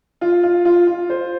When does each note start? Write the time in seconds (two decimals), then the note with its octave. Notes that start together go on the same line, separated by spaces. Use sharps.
0.21 F4
0.43 F4
0.65 F4
0.87 F4
1.10 C5